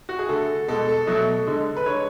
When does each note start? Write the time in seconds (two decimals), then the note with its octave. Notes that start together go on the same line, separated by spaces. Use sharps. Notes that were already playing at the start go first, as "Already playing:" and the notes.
0.09 F#4
0.19 G#4
0.28 D3 A3 A4
0.68 B2 G#3 A4
0.88 A4
1.07 B2 F#3 A3
1.47 D3 G#3
1.77 B4
1.86 D3 G#3 C#5